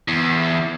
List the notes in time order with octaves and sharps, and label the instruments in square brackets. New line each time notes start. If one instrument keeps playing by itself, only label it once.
[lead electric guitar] E2